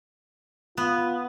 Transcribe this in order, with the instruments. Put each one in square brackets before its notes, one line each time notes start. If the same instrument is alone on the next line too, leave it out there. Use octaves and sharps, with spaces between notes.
[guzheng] B3 [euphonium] F4